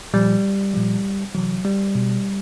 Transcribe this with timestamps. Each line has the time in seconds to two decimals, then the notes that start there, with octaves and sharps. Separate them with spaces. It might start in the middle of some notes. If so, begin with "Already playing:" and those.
0.14 A#2 F3 G3
0.74 A#2 F3
1.35 C3 E3 F#3
1.65 G3
1.95 B2